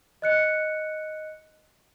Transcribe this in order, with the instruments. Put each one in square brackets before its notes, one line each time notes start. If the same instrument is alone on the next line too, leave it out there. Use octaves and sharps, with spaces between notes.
[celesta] D#5 F#6 C#7